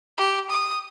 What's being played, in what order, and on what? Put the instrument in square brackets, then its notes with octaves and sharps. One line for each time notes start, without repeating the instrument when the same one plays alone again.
[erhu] G4
D#6